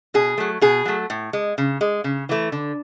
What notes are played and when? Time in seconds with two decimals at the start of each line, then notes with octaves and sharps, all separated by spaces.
0.14 B2 G#4
0.38 F#3 A3
0.61 B2 G#4
0.85 F#3 A3
1.10 A2
1.33 G#3
1.58 C#3
1.81 G#3
2.04 C#3
2.29 E3 A3
2.52 D3